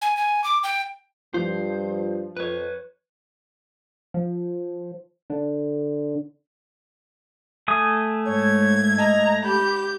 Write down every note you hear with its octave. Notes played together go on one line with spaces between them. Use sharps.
G#5
G#5
D6
G5
G2 F3 F4 C5
F2 B4 C#5
F3
D3
A3 G#5 D#6
G#2 C#5 G#6
D#5 A#5
G4 B5 G6